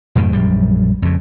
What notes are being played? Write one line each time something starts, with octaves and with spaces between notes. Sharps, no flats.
F2 G#2 B2 D#3
A#1 F#2 G3
F2 C#3